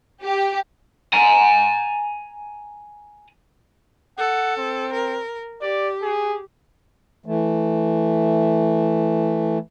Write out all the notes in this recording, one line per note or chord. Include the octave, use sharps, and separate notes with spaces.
G4
G#5 A#5
A4 F#5
C4
A#4
G4 D5
G#4
E3 A3